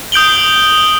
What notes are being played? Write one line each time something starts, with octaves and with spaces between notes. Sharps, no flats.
D#6 G6 D7 F#7 G7